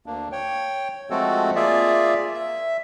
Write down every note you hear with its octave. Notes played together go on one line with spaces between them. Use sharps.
D2 A#3 D4
C#5 G5
F3 G#3 A3 C4 F#4 A4
A#3 F4 G#4 D5 E5
E5